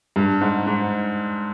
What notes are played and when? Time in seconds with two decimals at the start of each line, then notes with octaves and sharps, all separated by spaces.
0.16 G2
0.41 G#2
0.67 G#2